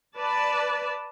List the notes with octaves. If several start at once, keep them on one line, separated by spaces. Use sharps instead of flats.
B4 D5 A5